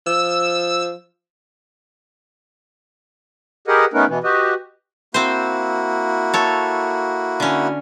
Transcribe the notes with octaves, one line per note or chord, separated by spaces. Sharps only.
F3 E6
G4 G#4 A#4 B4 D#5 F#5
A3 B3 C#4 D#4 A#4 B4
B2 E3 B3
F#4 G4 B4 D#5
A#3 C4 E4 F#4 C5
A4 C#5
D3 C#4